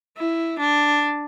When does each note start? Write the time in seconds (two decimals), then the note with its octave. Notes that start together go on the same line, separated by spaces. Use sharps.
0.18 E4
0.59 D4